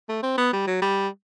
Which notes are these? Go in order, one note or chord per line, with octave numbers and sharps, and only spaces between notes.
A3
C4
B3
G3
F#3
G3